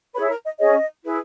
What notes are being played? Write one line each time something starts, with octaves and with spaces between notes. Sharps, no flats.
E4 G#4 B4 C#5 B5
A#4 A#5
D#5
C#4 G#4 C#5 D#5
E4 G#4 B4